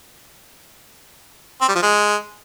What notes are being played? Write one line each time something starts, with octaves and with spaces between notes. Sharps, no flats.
C4
G3
F3
G#3